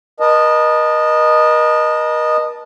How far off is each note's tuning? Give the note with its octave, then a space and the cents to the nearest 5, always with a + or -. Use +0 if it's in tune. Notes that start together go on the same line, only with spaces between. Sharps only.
A#4 +45 D#5 -10 A5 +0